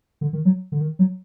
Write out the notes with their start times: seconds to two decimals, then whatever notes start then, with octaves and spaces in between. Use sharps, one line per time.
0.21 D3
0.33 D#3
0.45 F#3
0.72 D3
0.81 D#3
0.99 F#3